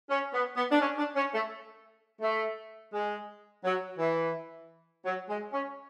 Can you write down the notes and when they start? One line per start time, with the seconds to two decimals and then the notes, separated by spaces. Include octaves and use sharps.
0.10 C#4
0.34 B3
0.57 B3
0.72 D4
0.81 C#4
0.98 D4
1.16 C#4
1.34 A3
2.22 A3
2.93 G#3
3.64 F#3
3.99 E3
5.06 F#3
5.29 G#3
5.53 C#4